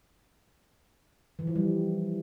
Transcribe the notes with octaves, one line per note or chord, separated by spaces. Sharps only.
E3
F3
G3